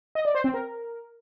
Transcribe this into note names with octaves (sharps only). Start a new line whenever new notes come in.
D#5
D5
C5
C4
A#4